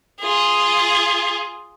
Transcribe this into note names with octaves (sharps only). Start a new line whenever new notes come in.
F4 G#4